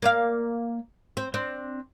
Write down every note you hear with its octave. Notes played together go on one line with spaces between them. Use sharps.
A#3 D5 F5
C4
C4 D4